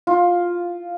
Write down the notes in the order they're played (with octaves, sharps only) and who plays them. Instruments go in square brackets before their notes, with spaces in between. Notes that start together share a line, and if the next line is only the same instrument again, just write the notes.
[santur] F4